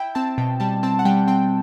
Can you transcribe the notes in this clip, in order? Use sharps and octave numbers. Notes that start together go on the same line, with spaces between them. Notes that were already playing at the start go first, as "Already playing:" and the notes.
Already playing: E4 G5
C4 A5
B2 G5
G3 A5
C4 A5
F#5
G3 G5
C4 G5